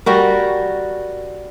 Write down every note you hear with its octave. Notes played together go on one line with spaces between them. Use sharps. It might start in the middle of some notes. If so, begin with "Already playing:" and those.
G3 F#4 A#4